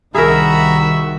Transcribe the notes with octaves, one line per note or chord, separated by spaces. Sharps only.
C2 D#3 F#4 G#4 A#4 E5 A#5 B5